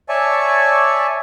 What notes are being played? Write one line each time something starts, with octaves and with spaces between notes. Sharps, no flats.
C#5 D5 E5 G#5 A5 C#6